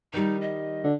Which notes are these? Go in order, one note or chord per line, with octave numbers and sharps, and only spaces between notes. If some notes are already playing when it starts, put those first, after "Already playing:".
D#3 G3 D#4
D#5
D3